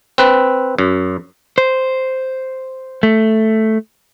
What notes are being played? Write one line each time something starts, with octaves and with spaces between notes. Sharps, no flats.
C4 B4
F#2
C5
A3